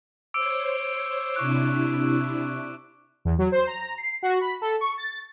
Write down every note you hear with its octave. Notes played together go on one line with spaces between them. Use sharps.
C5 C#5 D6 E6 D7
C3 D4 E4 C#6 D6 F#6
E2
F#3
C5
A#5
C7
F#4
B5
A4
C#6
A6